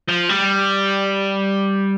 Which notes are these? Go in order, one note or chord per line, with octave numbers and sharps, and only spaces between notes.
F3
G3